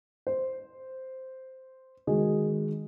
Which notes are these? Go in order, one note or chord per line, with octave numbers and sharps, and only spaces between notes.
C5
D#3 G#3 F#4 G#4